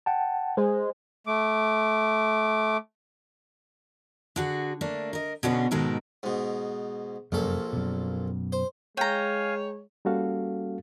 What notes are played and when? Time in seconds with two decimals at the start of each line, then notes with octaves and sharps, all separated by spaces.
0.06 F#5 G5 A5
0.57 G#3 C5
1.27 A3 D6
4.36 D3 F#4 G#4
4.81 A3 A#3 D4
5.13 A#4 D#5
5.43 B2 D3 B3 C#4 G#4
5.71 G#2 B2 D#3 G#3 A4 A#4
6.23 G#2 B2
7.32 F1 A#1 F#2 A#2 A4
7.73 F#2 B2
8.52 C5
8.97 G#3 C#5 F5 G5 G#5 A#5
10.05 G3 A#3 C#4 F#4 A4 F5